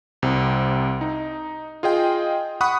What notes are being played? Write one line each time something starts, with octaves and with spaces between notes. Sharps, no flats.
C2 C3
D#4
F4 G#4 D#5 G5
F#5 B5 C#6 D#6 F#6